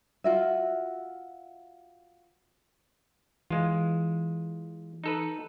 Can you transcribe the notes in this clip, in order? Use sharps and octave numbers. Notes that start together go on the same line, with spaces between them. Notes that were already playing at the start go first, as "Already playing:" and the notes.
F4 F#4 E5
E3 G#3 F4
D#4 A4 B4